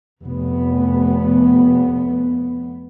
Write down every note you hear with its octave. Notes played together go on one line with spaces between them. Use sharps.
F1 B3